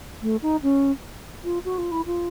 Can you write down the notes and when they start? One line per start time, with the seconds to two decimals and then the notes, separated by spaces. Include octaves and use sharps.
0.22 A3
0.42 D#4
0.63 C#4
1.44 F4
1.65 F#4
1.78 F4
1.92 E4
2.06 F4